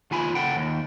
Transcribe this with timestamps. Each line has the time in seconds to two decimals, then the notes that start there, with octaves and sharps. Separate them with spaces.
0.11 D#2 F4 G#5 B5
0.35 C#3 A4 F#5 G5
0.57 D#2